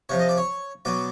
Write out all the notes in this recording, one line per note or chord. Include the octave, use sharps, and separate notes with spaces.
C3 F3 C#5
D#5
D5
C#5
B2 F#3 D5